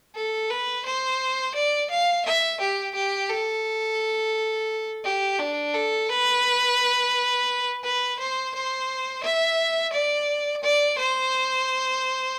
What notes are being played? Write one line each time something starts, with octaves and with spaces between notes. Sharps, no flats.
A4
B4
C5
D5
F5
E5
G4
G4
A4
G4
D4
A4
B4
B4
C5
C5
E5
D5
D5
C5